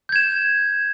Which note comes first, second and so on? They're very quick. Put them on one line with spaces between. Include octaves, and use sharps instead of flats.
G6 G#6 E7